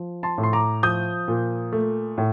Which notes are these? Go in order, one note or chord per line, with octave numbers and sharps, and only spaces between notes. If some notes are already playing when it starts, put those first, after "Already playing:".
Already playing: F3
A5 C6
A2
C6
A#5 D6
F3 D#6 G6
A#2
A3
A2